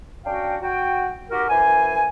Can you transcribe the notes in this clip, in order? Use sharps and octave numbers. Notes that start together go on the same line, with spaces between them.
C#4 D4 F#4 F5 G5
F#4 G5
D#4 F#4 G4 A#4
F#2 E3 C5 G#5